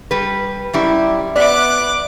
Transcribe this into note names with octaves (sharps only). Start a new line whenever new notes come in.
G3 B4
F#2 G3 E4
B3 B4 D5 E5 D6 F#6